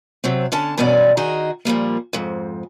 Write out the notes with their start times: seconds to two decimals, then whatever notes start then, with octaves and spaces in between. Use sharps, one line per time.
0.24 C3 F#3 C4
0.52 D3 C#4 A5
0.78 E2 G2 B2 C#4 D5
1.17 D#3 D#4 F#4 G#4
1.65 A#2 F3 G3 A#3
2.13 F2 G#2